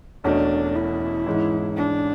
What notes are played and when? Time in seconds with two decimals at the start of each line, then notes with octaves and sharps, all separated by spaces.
0.24 E1 E2 B2 A3 C#4 D4
0.75 E4
1.27 G#2 E3 G#3 C#4
1.77 D4